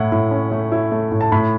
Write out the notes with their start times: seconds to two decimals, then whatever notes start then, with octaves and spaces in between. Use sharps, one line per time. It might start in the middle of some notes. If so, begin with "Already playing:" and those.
Already playing: A2 E4 F#5
0.12 A2
0.31 C#4
0.52 A3
0.72 E4
0.92 A3
1.12 A2
1.21 A5
1.32 A2 B5